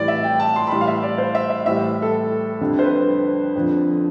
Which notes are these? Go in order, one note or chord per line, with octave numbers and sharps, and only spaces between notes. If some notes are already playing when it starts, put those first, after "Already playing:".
Already playing: A2 E3 G3 D5
E5
G5
A5
C6
B5
A2 E3 G3 C6
F5
E5
D5
C5
E5
E5
A2 E3 G3 E5
A4
F2 D3 G3
C5
B4
F2 D3 F3